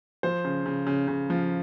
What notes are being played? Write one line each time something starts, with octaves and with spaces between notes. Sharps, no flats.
F3 C5
C#3
C#3
C#3
C#3
F3